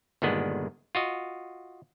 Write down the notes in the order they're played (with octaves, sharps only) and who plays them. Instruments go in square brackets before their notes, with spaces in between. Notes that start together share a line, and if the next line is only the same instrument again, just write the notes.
[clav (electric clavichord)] G1 A#2 D#3 G#3 B3 D4
F4 F#4 D#5